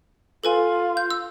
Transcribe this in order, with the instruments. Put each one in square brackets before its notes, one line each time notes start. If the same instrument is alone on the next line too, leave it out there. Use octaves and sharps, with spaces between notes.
[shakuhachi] F4 [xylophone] A4 B4 G#5
[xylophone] G6
E6